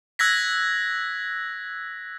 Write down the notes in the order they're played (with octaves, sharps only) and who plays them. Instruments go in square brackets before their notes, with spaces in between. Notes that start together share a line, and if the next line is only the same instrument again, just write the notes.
[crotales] E6 F#6 G#6 A#6 B6